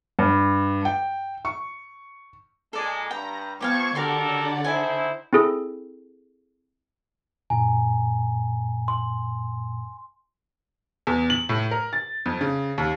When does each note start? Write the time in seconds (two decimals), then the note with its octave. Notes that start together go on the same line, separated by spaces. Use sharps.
0.19 G2
0.85 G5
1.45 C#6
2.73 A#2 G#3 A4 D5
3.11 G2 G5 A#5
3.61 F3 B3 C4 F5 G5 C#6 D6 G#6
3.95 D3 F#4 G4 A4 A#4 D5 F#5 C6
4.64 D#4 E4 A4 C5 G#5
5.33 C4 E4 G#4 A4
7.50 F#2 A#2 G#5 A#5
8.88 C6
11.07 E2
11.30 F#7
11.49 A2
11.71 A#4
11.93 A6
12.26 F2
12.41 C#3
12.78 D#2